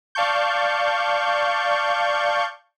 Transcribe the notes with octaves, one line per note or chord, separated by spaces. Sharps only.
D5 F5 A5 C#6 G6